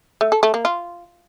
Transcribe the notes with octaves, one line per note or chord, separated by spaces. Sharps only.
A3
A4
A3
A#3
F4